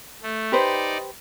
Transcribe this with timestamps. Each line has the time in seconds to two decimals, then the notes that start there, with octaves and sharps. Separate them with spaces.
0.23 A3
0.52 D#4 G4 B4 C5 D5